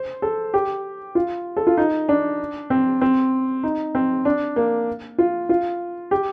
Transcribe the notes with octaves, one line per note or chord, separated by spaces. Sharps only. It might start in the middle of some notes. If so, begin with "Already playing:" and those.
Already playing: C5
A4
G4
F4
A4
F4
D#4
D4
C4
C4
D#4
C4
D4
A#3
F4
F4
G4